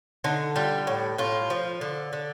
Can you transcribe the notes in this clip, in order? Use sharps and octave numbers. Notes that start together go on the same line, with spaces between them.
D3 D#4
G3 F4
A2
A2 F4
F3
D3
D3